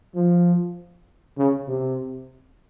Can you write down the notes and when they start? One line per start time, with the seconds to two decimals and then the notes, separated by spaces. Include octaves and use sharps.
0.15 F3
1.37 C#3
1.67 C3